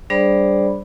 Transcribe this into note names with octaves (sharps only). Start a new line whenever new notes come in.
G3 D4 G#4 C5 D5 B5